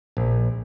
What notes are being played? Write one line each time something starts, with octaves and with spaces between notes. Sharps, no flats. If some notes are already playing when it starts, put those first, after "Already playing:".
A#1